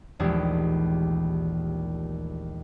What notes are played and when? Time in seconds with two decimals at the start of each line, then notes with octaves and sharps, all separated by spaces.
0.19 A#1 D#2 E3 G#3 A3 G4